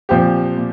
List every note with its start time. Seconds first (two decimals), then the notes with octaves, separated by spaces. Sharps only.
0.09 A#2 F3 C4 G4
0.57 A#2